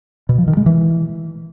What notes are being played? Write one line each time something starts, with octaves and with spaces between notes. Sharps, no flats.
B2
F3
D#3
G#3
E3